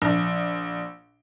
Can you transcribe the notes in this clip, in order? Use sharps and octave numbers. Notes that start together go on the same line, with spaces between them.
A#1